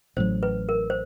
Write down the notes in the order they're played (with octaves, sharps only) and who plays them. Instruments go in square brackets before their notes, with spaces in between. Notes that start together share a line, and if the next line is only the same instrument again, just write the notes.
[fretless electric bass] A1 A2 F#3 [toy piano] C5
[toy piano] B4
A#4
C5